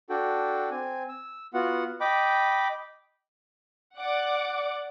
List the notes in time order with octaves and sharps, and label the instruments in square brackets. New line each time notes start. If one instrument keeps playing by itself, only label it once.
[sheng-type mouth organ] D4 F#4 A4 G5
C4 G#5
E6
B3 F4 F#4 F#5
D#5 G5 B5 D6
[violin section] D5 F#5 D6